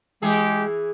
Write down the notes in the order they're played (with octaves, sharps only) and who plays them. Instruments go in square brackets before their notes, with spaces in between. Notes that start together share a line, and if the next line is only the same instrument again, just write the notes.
[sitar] E3 G#4 [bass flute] G#3 [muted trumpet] G4